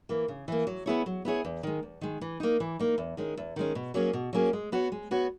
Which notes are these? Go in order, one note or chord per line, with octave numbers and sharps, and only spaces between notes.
E3 A#3
C#3
E3 A#3
F#3
B3 E4 G#4 C#5
F#3
B3 E4 G#4 C#5
E2
D#3 G#3
E2
D#3 G#3
E3
A#3 D#4
E3
A#3 D#4
E2
D#3 G#3 C#4
E2
D#3 G#3 C#4
B2
F#3 A#3 C#4 G#4
B2
F#3 A#3 C#4 G#4
G#3
B3 F#4 C#5
G#3
B3 F#4 C#5